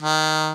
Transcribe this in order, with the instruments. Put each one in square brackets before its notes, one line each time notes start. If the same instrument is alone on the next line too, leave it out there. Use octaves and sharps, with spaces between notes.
[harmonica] D#3